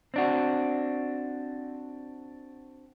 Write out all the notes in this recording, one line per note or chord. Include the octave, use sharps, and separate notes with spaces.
C4 D4 F#4